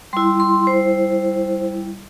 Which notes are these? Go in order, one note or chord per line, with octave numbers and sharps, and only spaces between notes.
G3 E4 C6
C6
C5